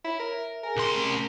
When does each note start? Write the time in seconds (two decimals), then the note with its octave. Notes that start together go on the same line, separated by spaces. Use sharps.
0.04 E4 C#5
0.20 A#4
0.33 E5
0.64 G#4 A#4 G#5
0.77 C2 C6
0.94 A3 C#4